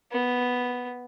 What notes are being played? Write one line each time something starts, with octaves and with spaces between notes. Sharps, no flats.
B3